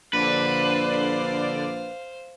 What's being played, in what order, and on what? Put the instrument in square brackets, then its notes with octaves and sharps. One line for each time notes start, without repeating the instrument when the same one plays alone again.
[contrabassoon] A#1 [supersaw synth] D3 D5 [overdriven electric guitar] B4 [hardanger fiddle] C5 F5